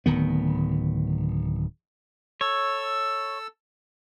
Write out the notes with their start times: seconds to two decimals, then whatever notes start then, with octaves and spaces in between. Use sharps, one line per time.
0.06 D1 D#3 B3
2.41 A4 C#5 E6